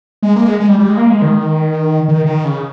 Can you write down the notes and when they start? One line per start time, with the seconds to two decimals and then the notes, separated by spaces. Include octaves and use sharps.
0.23 G#3
0.36 A#3
0.48 G#3
0.60 G#3
0.69 G3
0.79 G3
0.88 G#3
0.97 A#3
1.10 G#3
1.22 D#3
2.08 D#3
2.26 D#3
2.45 C#3